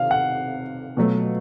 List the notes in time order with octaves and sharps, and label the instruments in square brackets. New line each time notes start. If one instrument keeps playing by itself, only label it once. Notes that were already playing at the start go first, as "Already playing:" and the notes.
Already playing: [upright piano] C3 D#3 [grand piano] F5
[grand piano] F#5
[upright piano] B2 F#3 A3